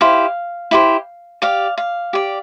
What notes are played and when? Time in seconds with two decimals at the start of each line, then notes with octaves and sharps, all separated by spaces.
0.01 E4 G4 C5 F5
0.71 E4 G4 C5
1.42 G4 D5 F5
1.78 F5
2.13 G4 D5